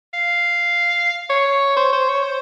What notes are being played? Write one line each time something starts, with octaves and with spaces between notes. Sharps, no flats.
F5
C#5
C5
C5
C#5
C5